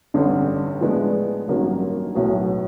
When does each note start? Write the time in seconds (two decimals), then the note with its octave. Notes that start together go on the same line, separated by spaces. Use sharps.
0.14 A1 G2 D3
0.81 A2 F3 G#3 B3 D4
1.48 A1 G2 D#3 F#3 A#3
2.15 B1 A2 F#3 B3